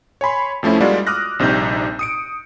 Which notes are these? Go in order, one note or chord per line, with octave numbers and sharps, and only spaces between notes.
C#5 G#5 B5 C6
F2 F3 A3 C#4 E4
G3 G#3 A#3 F4 F#4 D5
D6 D#6 F6 F#6 A#6
A#1 C3 G3 D#4 G6
D#6 C#7 D7